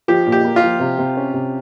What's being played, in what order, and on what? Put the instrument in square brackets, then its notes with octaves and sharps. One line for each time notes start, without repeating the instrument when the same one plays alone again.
[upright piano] F3 [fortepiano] G4
[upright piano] A#2
[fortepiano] G4
[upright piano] A#3
[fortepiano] F4
[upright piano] F3
C3
C3
C#4
C3